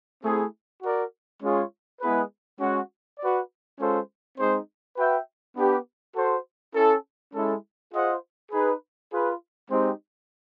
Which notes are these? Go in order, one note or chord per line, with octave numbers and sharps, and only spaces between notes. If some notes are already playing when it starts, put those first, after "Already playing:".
A3 C4 E4 G#4
F#4 A#4 D5
G#3 C#4 F4 G#4 C#5
G#3 B3 E4 G#4 B4
G#3 C#4 F#4
F#4 B4 D5
G#3 C#4 F4 A4 C5
G#3 C4 D#4 G#4 C5
F#4 B4 E5 G5
B3 D4 G4 B4
F#4 A4 C5
C#4 E4 A4
G#3 C#4 E4 A4
F4 G#4 C5 D#5 F#5
D#4 G#4 B4
F4 G#4 B4
G#3 C4 D#4 G4 C5